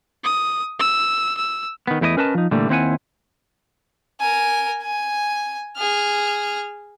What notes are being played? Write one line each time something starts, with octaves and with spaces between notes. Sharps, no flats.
D#6
E6
E6
D#3 B3
E2 A3 E4 A4 D#5
C#4 A#4 B4 D#5 G5 A5
F3 D#4
A#2 D3 E3 G3 A3
D#2 C4 E4 B4 F#5 G#5
A#4 G#5
G#5
G#4 F6